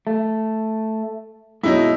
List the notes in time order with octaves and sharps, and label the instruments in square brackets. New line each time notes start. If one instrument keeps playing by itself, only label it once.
[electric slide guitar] A3
[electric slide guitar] B2 G#3 [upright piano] F#3 D#4 E4